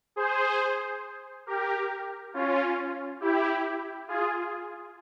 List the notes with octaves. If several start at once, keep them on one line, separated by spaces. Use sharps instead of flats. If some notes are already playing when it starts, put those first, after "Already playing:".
G#4 C5
G4 A#4
C#4 F4
E4 G4
F4 G#4